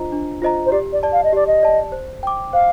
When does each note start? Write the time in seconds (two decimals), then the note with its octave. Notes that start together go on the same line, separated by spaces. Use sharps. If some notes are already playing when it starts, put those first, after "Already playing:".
Already playing: D4 F4 C5 D#5 A#5
0.12 D4
0.42 F4 C5 D#5 A#5
0.66 C5
0.72 G4 D5
0.92 D5
1.03 D5 A5
1.13 F5
1.24 D#5
1.33 G4 D5
1.47 D#5
1.63 D5 A5
1.92 C5
2.23 G5 D6
2.53 C5 F5